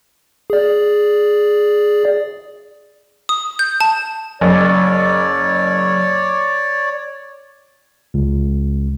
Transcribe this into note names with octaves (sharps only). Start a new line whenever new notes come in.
G#4 D5
D#6
G6
A5
F#1 C#5 D5
C#2